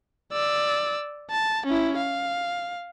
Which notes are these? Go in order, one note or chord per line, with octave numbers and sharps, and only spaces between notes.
D5 E6
A5
C#4 E4
F5